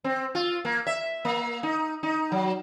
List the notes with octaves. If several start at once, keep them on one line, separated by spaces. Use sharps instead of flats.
C4
F4
A#3
E5
A#3
D#4
D#4
F#3